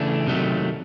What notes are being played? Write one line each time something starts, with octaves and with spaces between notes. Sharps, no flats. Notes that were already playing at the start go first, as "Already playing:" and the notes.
Already playing: C#3 E3 A3 D4
C3 D#3 F#3 A3